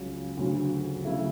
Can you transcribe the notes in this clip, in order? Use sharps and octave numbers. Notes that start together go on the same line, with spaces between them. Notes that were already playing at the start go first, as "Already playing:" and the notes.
Already playing: C#2 C#3 F#3 C#4 G#4
D2 C#3 F#3 C#4 F#4
C#3 F#3 A3 E4